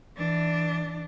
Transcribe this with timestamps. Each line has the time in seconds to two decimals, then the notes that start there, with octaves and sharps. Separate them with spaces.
0.16 E3 D4